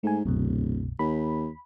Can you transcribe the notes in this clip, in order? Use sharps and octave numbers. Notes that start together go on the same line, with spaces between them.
G#2 A3 G#5
D1 C2 F#2 B2
D#2 B5